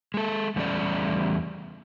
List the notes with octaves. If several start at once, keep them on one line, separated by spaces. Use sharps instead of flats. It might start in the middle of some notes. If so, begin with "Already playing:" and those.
G#3 A4
E2 G3 A3 C#4 D5